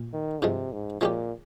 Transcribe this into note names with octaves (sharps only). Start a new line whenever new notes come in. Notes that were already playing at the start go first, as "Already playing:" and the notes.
Already playing: A#2
D#3
G2 C3 F3 G#3
G#2
A#2 F3 G#3 C#4 G4